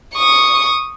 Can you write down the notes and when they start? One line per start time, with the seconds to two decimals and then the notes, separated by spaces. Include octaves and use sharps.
0.15 C#6 D#6